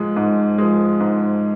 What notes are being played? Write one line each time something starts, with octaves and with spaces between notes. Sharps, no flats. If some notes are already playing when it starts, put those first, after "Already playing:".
Already playing: G#2 F3 G#3
G#2
F3 G#3
G#2